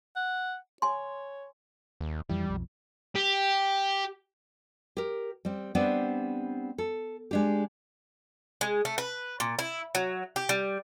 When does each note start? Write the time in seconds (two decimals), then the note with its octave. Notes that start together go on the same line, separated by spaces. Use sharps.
0.16 F#5
0.82 C#5 G#5 C6
2.01 D#2
2.29 F2 E3 G3
2.46 B1 F2
3.16 G4
4.97 G4 A#4
5.45 G3 C4
5.75 G3 B3 C4 D4 C5 D5
6.78 A4
7.31 G#3 D4 G4
8.61 G#3
8.85 A3
8.98 B4
9.40 A#2
9.59 E4
9.95 F#3
10.36 G4
10.49 G3